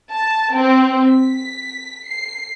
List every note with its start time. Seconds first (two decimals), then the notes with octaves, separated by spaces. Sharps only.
0.11 A5
0.55 C4
1.09 B6
2.07 C7